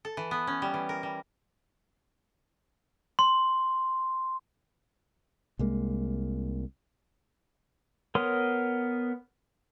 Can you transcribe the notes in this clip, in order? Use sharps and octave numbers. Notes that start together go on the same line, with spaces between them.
A4
E3
B3
C#4
G3
E3
A#4
G3
C6
C2 G#3 A#3
B3 A#4 C#5 C6 D#6